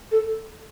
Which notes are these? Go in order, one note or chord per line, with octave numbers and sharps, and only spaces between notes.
A4